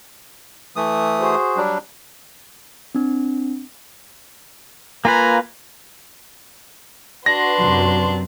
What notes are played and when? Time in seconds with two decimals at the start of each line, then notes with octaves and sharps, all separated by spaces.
0.76 E3 A3 D#6
1.20 F#4 G#4 C5
1.57 F#3 G3 D4
2.95 C4 D4
5.05 A#3 F4 B4 G#5 A#5
7.26 D4 F#4 B4 C6 A#6
7.60 F#2 C3 F#3